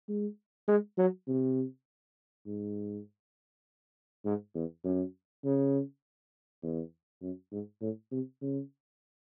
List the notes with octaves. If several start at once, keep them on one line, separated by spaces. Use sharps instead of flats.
G#3
G#3
F#3
C3
G#2
G#2
E2
F#2
C#3
E2
F#2
G#2
A2
C3
C#3